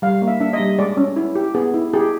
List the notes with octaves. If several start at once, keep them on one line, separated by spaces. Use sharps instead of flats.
G3 F5
A#3
E5
D4 E5
D#5
G3
G#3 D5
C#4
E4
G4
B3 G#4
E4
G4 G#4